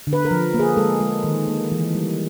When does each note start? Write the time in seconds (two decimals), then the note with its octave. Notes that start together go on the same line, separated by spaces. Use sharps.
0.07 D3
0.13 B4
0.25 A#4
0.31 F3
0.54 A#3
0.60 G#4
0.77 G#3 A4
1.00 G#3
1.24 D#3
1.48 A#3
1.72 E3
1.95 G3